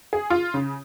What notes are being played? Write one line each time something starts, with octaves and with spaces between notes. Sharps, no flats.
G#4
F4
C#3